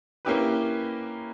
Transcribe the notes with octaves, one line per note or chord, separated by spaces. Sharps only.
A#3 C#4 E4 G4 B4